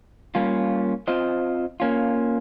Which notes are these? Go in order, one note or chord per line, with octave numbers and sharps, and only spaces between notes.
G3 A#3 C#4 F4
C4 F4 C5 D#5
A#3 C#4 F4